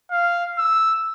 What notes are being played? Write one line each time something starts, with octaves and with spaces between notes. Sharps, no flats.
F5
E6